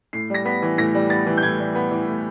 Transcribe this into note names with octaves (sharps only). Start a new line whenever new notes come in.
A2 C7
G3 A#6
B3 B6
E3
A2 A#6
G3
B3 A6
E3
G6
A2 G#6
G3
B3
E3
A2